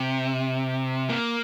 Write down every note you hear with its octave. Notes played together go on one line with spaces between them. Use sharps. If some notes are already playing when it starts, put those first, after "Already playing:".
Already playing: C3
A#3